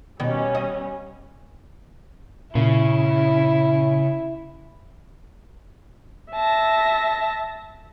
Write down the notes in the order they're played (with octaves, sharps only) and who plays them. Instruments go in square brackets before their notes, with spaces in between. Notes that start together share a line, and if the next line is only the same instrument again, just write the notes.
[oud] B2 D#3 [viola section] G3 B3 C#4
[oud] D#5
[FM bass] A#2 [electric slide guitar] C#3 [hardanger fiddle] E4
[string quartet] E5 A5 A#6